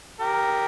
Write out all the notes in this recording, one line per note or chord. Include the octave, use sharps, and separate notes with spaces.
G4 A#4